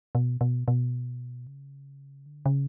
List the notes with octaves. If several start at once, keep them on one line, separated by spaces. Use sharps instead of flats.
B2
B2
B2
C#3
D3
C#3